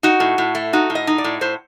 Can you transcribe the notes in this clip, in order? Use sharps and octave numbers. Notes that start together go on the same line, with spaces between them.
D#4 F#4
A2
A2
A3
D#4 F#4
A2
D#5
D#4
D5
A2
A2 C5